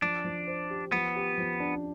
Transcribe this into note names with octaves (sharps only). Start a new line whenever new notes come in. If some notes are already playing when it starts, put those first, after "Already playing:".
F3 D4
F3
C5
G4
F3 B3
G4
F3
D4